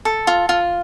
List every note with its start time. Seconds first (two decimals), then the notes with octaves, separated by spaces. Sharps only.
0.05 A4
0.27 F4
0.49 F4